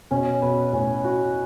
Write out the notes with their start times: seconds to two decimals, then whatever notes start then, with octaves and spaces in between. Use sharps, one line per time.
0.11 B2 C#4
0.42 B2 B4
0.73 A2 C#4
1.04 F#4